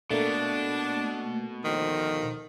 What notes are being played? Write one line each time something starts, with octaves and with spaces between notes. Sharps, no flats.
B2 A3 A#3 D4
D2 D#3 F3